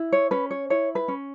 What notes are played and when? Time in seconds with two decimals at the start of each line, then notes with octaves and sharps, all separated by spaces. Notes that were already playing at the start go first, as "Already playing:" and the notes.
Already playing: E4
0.12 C#5
0.31 C#4 B4
0.51 C#5
0.70 E4 C#5
0.95 B4
1.08 C#4